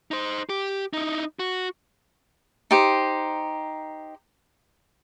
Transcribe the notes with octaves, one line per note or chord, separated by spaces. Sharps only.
D#4 C5
G4
D#4 E4
F#4
D#4 G4 C5